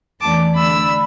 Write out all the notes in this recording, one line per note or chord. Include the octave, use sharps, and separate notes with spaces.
E2 E3 A3 D4 A5 D6
D3 A3 D4 B5 E6